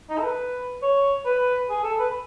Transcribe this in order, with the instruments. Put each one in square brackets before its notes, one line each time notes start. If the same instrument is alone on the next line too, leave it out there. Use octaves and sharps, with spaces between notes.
[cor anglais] D#4
A4
B4
C#5
B4
G#4
A4
B4